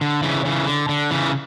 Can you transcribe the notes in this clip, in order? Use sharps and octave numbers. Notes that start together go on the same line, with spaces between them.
D3
C#3 E3
C#3 E3
D3
D3
C#3 E3